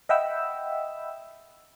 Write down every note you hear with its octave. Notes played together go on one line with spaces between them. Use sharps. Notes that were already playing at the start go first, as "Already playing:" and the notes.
D#5 E5 F#5 G5 B5 E6